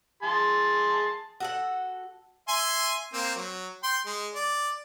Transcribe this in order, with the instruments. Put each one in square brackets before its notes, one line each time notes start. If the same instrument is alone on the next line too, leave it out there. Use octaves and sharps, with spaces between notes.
[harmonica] G#4 A5 C6
[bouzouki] F#4 A4 F#5
[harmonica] E5 G#5 C6
A#3 C4
F#3
G5 C6
G#3
D5